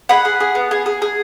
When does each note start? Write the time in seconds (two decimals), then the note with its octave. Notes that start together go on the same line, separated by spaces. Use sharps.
0.09 G#4 F#5 B5
0.25 G#4
0.40 G#4
0.55 B3
0.71 G#4
0.86 G#4
1.02 G#4